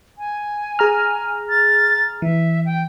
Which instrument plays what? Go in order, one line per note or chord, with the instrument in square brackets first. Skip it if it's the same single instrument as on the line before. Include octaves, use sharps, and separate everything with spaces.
[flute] G#5
[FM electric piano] G#4 A#5 F6
[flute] A6
[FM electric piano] E3 [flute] E5
[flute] G5